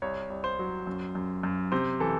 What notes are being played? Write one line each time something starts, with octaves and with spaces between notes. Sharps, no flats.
C2 C#5
C2
C5
F#3
F#2
F#2
F#2
C3 C5
E3 A4